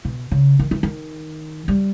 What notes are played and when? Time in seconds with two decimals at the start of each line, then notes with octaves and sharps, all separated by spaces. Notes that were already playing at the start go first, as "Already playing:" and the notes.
0.05 B2
0.32 C#3
0.59 D#3
0.71 E3
0.83 D#3
1.68 G3